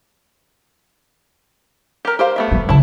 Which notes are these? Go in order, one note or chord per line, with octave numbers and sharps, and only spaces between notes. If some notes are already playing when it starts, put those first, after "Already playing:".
G4 A#4
G4 C5 F5
A3 B3 E5
G3
C#3 G#3 E4 A5